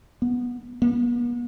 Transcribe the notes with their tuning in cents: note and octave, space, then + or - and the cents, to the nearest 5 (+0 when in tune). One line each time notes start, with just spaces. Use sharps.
B3 -15
B3 -45